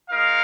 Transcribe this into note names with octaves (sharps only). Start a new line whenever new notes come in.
G#3 D#4 A#4 F5